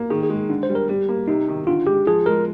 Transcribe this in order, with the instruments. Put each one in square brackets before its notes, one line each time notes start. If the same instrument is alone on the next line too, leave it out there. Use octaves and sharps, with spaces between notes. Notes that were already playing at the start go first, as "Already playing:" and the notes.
Already playing: [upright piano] A#3
[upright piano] D#3 [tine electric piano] G#4
[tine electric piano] G#4
[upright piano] G#3
D3
[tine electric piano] C5
[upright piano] G3
[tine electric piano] A#4
[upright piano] G3 [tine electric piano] G4
[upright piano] A#3
[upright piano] C3 [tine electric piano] D#4
[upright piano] D#3
[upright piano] D3 [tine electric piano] F4
[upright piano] G#3 [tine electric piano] G4
[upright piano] F3 [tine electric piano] G#4
[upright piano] G#3 [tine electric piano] A#4